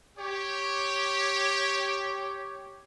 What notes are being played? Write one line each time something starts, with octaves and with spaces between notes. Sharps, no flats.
G4 C#5